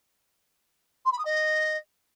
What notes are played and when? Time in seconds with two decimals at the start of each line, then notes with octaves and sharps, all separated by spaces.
1.05 C6
1.12 B5
1.18 D#6
1.25 D#5